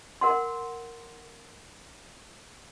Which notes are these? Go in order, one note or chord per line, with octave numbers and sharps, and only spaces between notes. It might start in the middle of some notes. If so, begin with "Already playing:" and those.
A#4 F#5 C6